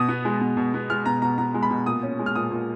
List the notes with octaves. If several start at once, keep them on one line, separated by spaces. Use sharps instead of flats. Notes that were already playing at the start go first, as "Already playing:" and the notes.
Already playing: B2 D#6
B3
G#3
B2
B2
B3
G#3 F6
B2 A#5
B2 A#5
B3 A#5
G#3
B5
B2
A#2 D#6
C#4
G#3
F6
A#2 D#6
A#2